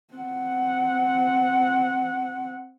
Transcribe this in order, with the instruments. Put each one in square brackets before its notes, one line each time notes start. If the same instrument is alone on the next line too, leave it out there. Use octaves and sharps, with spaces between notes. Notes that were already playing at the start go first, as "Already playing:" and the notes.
[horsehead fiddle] C4 F#5